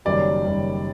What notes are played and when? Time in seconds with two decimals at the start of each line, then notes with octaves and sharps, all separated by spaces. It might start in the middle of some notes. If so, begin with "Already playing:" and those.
0.05 F#1 F#2 D#3 G3 D5
0.45 F#1 F#2 D#3 G3